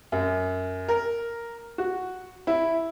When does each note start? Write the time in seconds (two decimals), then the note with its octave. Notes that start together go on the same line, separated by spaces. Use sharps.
0.12 F#2
0.88 A#4
1.78 F#4
2.47 E4